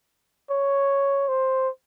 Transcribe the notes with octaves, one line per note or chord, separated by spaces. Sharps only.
C#5
C5